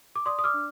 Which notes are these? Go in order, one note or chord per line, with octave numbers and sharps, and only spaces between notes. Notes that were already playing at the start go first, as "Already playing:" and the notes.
D6
D5 C6 D#6
D#6
D6 F6
D4